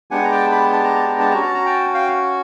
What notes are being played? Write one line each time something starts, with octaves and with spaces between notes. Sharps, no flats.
G#3 B3 D4 G4 F#5 G#5
A#5
G5 A5
A5 B5
A5
A#5
A5
A#5
A5
C#4 F#4 A#5
A5
A#5
G5 A5
F5 G5